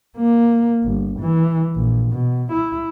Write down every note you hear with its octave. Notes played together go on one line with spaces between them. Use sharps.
A#3
G1
E3
A#1
B2
E4